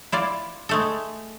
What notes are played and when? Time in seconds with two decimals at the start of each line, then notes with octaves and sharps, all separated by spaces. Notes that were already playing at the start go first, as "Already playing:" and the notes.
0.12 E4 F4 D5
0.69 G#3 A3 A4